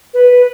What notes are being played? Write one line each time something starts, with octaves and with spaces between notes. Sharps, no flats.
B4